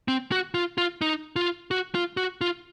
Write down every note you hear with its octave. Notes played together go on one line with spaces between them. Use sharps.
C4
F#4
F4
F4
D#4
F4
F#4
F4
F#4
F4